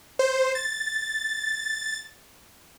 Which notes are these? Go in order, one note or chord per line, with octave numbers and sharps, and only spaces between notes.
C5
A6